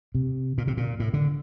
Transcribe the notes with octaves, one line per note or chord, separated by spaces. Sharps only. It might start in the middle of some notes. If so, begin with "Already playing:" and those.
C3
A#2
C3
A#2
A2
D3